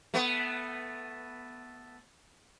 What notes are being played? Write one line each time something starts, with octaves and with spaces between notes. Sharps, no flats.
A3 B3